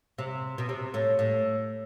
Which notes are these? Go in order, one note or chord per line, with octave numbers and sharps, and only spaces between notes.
C3
B2
C3
A2
A2